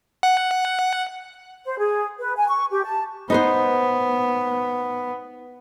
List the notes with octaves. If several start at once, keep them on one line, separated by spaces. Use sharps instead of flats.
F#5
C5
G#4
B4
G#5
C#6
G4
A5
B3 D#4 B4 C5